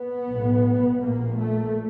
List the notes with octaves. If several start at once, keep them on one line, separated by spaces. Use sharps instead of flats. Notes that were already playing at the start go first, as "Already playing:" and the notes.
Already playing: B3
B1 A2
A#1 A#2 A#3
A3